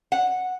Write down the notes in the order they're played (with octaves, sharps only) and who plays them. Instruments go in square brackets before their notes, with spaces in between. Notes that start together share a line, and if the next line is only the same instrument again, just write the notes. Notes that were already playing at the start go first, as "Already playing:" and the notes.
[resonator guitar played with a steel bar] F#5